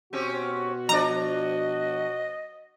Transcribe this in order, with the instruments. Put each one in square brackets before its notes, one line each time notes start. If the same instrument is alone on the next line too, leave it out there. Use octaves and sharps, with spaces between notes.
[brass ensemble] B2 F#4 [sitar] C4 C#4 G4
[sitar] F3 D4 D5 [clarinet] D#5 [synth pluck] A#5